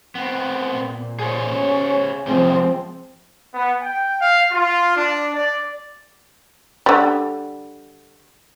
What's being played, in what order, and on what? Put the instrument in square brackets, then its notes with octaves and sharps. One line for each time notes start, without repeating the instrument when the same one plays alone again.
[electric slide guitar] B3 C4
[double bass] A#2
[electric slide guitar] G#4 C5 C#5
[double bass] C#4
[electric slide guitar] C3 G3 G#3 [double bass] F3 C4
[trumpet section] B3
G5
F5
F4
D4
D5
[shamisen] D3 G3